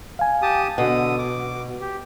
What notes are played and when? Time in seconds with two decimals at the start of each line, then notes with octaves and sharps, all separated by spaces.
0.19 F5 G#5
0.42 G4 A5 D#6
0.78 B2 D3 F#5 D#6
1.19 D6
1.81 G4